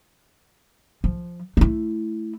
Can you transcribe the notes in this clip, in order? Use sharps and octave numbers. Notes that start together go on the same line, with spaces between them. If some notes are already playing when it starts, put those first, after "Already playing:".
F3
A3 E4